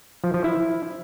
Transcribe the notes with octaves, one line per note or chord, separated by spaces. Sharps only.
F3
F3
E4